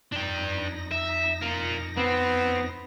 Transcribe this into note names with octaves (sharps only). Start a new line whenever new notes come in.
F2 D4 D#4 G5 A#6
E5
F4 A#4
B3 C4